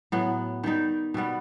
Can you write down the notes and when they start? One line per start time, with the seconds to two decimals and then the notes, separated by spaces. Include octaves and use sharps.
0.12 A2 F#3 B3
0.64 D#3 G3 D#4
1.14 B2 G3 B3